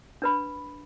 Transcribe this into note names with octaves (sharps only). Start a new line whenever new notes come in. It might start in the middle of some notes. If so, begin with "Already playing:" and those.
D4 B4 B5